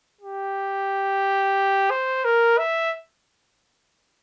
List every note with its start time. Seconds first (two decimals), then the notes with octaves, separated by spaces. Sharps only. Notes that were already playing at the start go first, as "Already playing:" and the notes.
0.21 G4
1.90 C5
2.24 A#4
2.58 E5